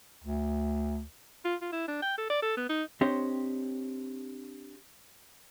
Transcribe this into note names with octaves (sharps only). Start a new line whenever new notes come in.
D2
F4
F4
E4
D4
G5
A4
D5
A4
B3
D#4
C4 D4 G4 C5 C#5 D#5